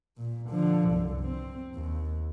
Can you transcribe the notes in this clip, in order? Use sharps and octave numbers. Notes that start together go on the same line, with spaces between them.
A#2
D3 F3
C2 F#2
C4
D#2